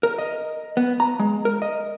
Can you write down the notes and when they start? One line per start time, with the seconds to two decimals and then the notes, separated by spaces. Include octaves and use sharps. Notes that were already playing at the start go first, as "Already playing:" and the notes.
0.03 A#4
0.18 D#5
0.77 B3
1.00 A#5
1.19 G#3
1.45 A#4
1.62 D#5